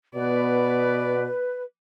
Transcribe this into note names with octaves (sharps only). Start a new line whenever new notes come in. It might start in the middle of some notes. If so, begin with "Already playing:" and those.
B2 B3 B4 D5